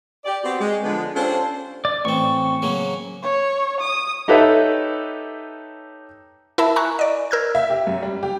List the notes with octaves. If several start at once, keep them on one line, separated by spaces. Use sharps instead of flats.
G4 D5
B3 C4 F#4 G4
G#3
D3 F3 G#3 B3
C#4 D4 F4 G4 A4 C5
D5
A1 C4 C#6
C#3 F#3 A#3
C#5
D#6
D#4 G4 A4 B4 C#5 E5
E4 A#4 E5 A5 B5
G#5 A#5 B5 C#6 F#6
D5 D#5
A#4 E6 F6 G6 G#6
E5
G4
F#2
G3
G4